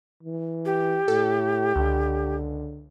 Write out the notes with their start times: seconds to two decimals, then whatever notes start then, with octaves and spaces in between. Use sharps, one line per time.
0.23 E3
0.65 G4
1.08 A2 A4
1.76 C#2 D3